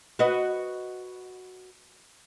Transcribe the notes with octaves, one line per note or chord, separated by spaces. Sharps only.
F#4 B4 D#5